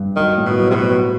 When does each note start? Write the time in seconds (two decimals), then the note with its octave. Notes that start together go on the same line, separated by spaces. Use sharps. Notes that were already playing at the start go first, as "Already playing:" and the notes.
Already playing: G2
0.16 D#3 F#3
0.38 A2
0.45 B2
0.60 F#3
0.70 C3
0.75 B2
0.83 F#3